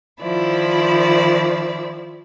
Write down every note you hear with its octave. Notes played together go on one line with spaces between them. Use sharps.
D#3 F3 E4 D5